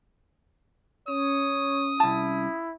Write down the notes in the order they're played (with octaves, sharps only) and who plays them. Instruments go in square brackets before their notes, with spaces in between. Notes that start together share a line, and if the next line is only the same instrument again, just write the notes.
[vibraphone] C#4 [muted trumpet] C#5 [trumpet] D#6
[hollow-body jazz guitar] C2 A5 [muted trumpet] E4